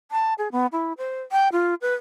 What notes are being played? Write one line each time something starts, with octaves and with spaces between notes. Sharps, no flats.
A5
G#4
B3
E4
C5
G5
F4
B4